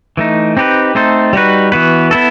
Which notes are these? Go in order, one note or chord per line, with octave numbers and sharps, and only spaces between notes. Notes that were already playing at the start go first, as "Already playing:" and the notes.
E3 A3 D#4
C4 D#4 G4 B4
A3 C4 D#4 A4 C5
G3 D#4 F#4 B4
E3 B3 F#4 B4
B3 E4 A4